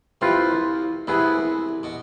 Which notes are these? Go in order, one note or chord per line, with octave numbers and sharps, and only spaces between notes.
C2 C3 C4 F4 B4 F5
C2 C3 B3 E4 G#4 B4
B2